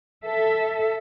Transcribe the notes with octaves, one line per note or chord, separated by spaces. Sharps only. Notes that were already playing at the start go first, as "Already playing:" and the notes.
A4 E5